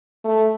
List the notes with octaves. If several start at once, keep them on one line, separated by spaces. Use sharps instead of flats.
A3